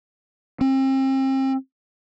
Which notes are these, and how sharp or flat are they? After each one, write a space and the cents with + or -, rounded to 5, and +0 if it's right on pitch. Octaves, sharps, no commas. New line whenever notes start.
C4 +35